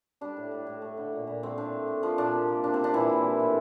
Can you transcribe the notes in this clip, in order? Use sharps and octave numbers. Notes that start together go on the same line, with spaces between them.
G3 D4
A2
A2
A2
A3
D3
A#2
A#2
A3 C4
A2 D4
A3
A3
F3 A#3 F4
A#2 D4
C3
A#3
C3 D4
C4
C3 D4
A#2 E3 E4
A#2
G3
A2